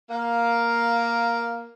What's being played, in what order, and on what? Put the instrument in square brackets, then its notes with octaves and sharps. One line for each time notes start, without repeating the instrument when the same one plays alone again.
[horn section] A#3 F5